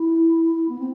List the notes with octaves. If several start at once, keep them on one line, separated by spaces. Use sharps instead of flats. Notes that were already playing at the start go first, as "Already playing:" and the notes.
Already playing: E4
E4
B3
C4